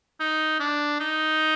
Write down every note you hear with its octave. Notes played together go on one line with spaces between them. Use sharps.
D#4
D4
D#4